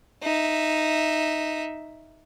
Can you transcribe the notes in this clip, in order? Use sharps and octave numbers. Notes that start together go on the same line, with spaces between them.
D#4 E5